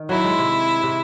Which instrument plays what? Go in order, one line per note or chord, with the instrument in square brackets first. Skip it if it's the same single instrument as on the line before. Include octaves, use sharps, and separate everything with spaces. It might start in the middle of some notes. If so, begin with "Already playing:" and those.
Already playing: [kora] D#3
[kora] F#3 [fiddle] E4
[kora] G#3
C3
C3